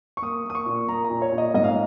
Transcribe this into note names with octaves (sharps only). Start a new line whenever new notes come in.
C#6
A#3 D#6
A#3 D#6
C#6
A#2
A#3 A#5
A#5
A#2
C#5
A#2
D#5
G#2 D#5
F5